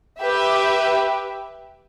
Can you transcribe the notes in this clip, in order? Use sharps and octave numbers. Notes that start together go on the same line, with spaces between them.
G4 B4 E5